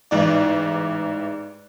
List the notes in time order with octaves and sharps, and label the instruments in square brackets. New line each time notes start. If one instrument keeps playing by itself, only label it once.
[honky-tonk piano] A1 G#2 D5